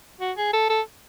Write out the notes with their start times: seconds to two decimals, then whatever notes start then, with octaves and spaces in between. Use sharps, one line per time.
0.21 F#4
0.37 G#4
0.53 A4
0.70 A4